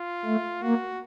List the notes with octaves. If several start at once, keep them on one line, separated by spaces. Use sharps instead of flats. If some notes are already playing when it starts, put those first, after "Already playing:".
Already playing: F4
A3
A#3 F#4